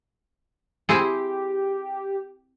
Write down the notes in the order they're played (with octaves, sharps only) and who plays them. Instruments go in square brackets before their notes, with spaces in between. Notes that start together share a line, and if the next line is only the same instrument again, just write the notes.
[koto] C4 E4 G#4 [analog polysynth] G4